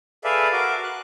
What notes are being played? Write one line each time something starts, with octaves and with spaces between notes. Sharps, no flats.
G#4 A4 B4 D5 E5 F5
F#4 A#4 D6
F#6